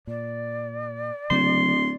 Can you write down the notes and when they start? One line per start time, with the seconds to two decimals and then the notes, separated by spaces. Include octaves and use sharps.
0.07 A#2 D5
1.30 D1 C#3 F#3 A#3 C6